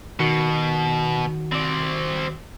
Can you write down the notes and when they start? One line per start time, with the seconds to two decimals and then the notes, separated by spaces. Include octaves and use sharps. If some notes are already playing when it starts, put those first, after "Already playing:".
0.20 B2 D#3 F#4 C#7
1.52 C4 D5